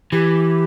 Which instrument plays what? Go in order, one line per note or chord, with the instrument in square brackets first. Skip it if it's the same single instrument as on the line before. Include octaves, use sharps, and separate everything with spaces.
[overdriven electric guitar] E3 [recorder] G4